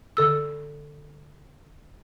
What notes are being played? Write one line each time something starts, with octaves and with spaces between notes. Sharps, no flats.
D3 A4 E6